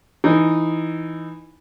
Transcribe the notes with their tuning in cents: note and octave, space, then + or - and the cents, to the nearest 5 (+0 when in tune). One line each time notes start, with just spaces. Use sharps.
E3 +0 D#4 +0